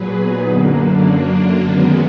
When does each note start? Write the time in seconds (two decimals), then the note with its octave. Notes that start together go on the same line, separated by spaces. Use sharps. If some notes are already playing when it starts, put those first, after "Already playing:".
Already playing: A#2 F#3 G#4 B4
0.16 B3 D#4
0.45 F#2 D3 F#3 A#3 D4
1.61 F#2 D#3 F#3 G#3 B3